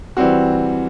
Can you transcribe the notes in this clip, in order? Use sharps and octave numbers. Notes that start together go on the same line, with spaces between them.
E3 G3 C4 F#4